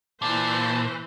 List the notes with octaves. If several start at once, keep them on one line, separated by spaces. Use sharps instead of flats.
A#2 E3 C5 A5